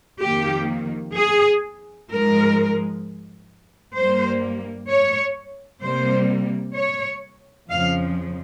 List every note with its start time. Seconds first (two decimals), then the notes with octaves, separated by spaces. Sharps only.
0.23 F2 D#3 A#3 G4
1.17 G#4
2.10 G#2 F3 G#3 A#4
3.97 G2 G3 A#3 C5
4.90 C#5
5.83 C3 G3 A#3 C5
6.76 C#5
7.70 F2 C#3 F3 F5